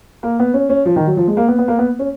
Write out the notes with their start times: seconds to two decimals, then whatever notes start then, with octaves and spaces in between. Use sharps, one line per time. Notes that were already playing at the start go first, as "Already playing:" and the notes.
0.23 A#3
0.39 B3
0.54 C#4
0.69 C#4
0.85 F3
0.96 D#3
1.07 F#3
1.17 F3
1.27 G#3
1.37 A#3
1.48 B3
1.58 B3
1.68 A#3
1.79 B3
1.99 C#4